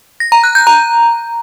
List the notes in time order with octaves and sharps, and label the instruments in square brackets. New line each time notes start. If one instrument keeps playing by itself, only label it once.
[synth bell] A#6
A#5
F#6
G6
A#5